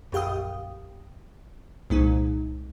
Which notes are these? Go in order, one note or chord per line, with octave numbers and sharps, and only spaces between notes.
A#1 F#2 G4 F5 G5 D#6
C2 A#2 G#3 D#4